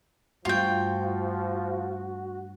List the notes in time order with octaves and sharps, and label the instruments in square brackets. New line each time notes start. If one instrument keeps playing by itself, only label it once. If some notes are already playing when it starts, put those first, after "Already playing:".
[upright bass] G2 A3 [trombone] F3 [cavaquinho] F4 G5 [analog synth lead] F#4